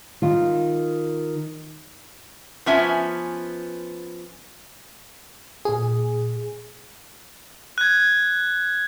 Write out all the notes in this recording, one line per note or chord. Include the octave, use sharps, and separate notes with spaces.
D#3 F4
F3 B3 C#4 E5 G#5
A#2 G#4
F#6 G#6